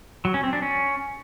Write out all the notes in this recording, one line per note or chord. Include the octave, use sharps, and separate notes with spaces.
F#3
C#4
C4
D4
C#4